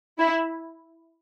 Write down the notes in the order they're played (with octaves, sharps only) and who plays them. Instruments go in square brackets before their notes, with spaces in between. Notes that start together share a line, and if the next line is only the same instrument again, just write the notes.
[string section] E4